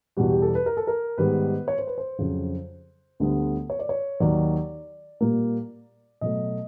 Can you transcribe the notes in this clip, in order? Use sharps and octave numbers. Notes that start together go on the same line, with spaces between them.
E2 B2 G3 F#4
G4
A4
B4
A#4
A4
A#4
G#2 D#3 G3 B3 B4
C#5
C5
B4
C5
F2 C#3 F#3
D2 D3 G3 B3
C#5
D5
C#5
D#2 D#3 F#3 D5
A#2 G3 A#3
B2 F#3 A3 D#5